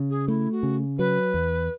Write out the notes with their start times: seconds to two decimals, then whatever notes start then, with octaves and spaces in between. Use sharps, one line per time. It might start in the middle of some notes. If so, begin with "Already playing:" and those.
Already playing: C#3
0.10 G#4
0.28 A3 E4
0.52 F#4
0.63 C#3
0.98 F#3 B4
1.34 E2